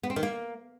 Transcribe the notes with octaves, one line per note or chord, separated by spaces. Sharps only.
B3
C4
D#3
A#3